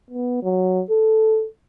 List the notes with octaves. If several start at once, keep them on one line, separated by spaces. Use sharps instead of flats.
B3
F#3
A4